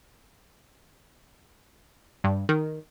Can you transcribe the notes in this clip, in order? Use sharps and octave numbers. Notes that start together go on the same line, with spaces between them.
G2
D#3